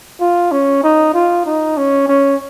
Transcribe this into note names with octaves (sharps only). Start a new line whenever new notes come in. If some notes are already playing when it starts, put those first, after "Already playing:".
F4
C#4
D#4
F4
D#4
C#4
C#4